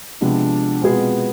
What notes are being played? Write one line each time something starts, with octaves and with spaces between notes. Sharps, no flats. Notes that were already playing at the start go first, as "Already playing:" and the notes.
C3 F3 G#3 B3 D4
B2 G#3 B3 C4 F4 G#4